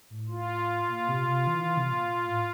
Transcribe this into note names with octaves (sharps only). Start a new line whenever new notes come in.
A2
F4
A#2
C3
C3
E3
E3
C3
A#2
A#2
A2